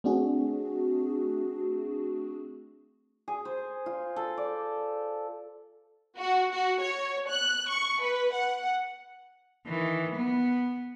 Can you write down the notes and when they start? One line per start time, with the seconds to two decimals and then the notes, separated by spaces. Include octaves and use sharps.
0.04 A3 C4 D4 F#4 G#4
3.28 G#4
3.45 C5
3.86 F4
4.16 A4
4.37 D5
6.17 F#4
6.52 F#4
6.81 C#5
7.28 F#6
7.69 C#6
8.02 B4
8.32 F#5
9.66 D#3 E3
10.15 B3